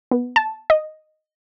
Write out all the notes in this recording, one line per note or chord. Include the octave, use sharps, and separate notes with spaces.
B3
A5
D#5